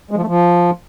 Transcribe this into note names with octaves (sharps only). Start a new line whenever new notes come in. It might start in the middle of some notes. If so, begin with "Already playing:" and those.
G#3
F3
A3
F3